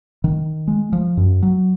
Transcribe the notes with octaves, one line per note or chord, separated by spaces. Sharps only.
D#3
G#3
F3
F#2
F#3